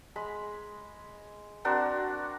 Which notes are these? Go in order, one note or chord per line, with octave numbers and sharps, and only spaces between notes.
G#3 B5
C4 D4 F#4 A#4